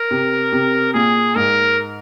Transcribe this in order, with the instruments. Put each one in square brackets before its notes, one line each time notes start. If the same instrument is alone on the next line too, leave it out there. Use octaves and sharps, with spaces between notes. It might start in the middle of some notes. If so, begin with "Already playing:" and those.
Already playing: [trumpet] A#4
[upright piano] C3
C3
[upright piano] A#2 [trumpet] G#4
[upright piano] G#2 [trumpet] A#4